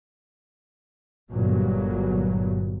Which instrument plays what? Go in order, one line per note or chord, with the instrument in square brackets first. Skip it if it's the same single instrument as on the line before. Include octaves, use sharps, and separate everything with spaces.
[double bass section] G1 A#2 F#3